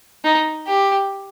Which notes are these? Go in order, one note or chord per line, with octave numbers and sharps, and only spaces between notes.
D#4
G4